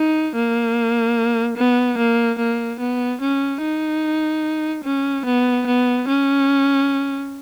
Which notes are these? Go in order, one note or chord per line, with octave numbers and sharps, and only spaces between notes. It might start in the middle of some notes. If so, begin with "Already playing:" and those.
Already playing: D#4
A#3
B3
A#3
A#3
B3
C#4
D#4
C#4
B3
B3
C#4